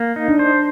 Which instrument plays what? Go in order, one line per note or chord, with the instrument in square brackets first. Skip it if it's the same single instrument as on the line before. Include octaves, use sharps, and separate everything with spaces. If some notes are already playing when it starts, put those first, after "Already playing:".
Already playing: [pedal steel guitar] A#3
D#4
[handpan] D4
[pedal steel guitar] C5